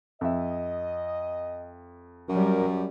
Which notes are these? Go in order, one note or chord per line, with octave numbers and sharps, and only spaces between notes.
F2 D#5 E5
F#2 F#3 G3 A#4